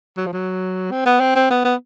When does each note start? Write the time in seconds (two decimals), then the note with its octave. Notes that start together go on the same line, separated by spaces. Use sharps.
0.17 F#3
0.26 F3
0.33 F#3
0.91 C4
1.06 B3
1.20 C4
1.35 C4
1.50 B3
1.65 B3